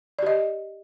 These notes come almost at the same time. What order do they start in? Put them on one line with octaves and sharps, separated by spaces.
D5 G4 D#5